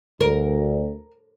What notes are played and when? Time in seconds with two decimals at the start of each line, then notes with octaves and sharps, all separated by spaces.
0.21 D2 A#4